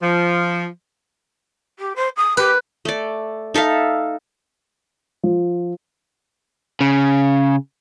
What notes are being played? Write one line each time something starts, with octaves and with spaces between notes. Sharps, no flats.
F3
G4
C5
D#6
G4 B4
A3 D5
D#4 A4 E5 F5
F3
C#3